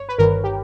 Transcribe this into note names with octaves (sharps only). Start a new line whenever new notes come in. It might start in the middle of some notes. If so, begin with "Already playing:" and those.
Already playing: G1 C#5
B4
G1 G2 D#3 A#4
G4